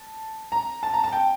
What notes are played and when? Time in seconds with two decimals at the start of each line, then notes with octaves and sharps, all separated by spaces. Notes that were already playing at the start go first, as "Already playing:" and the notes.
Already playing: A5
0.52 A#5
0.83 A5
0.94 A#5
1.04 A5
1.12 G5